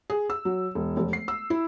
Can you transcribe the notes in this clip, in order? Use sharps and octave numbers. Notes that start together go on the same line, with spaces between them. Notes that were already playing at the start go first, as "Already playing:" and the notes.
G#4
E6
F#3
E1
F1
C7
E6
E4